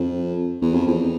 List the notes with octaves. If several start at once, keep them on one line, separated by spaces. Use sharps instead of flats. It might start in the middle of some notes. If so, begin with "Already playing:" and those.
Already playing: F2
E2
F2
E2